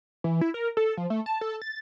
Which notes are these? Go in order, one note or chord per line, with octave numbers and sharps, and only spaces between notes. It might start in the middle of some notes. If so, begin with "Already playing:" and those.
E3
E4
A#4
A4
F3
A3
A5
A4
A6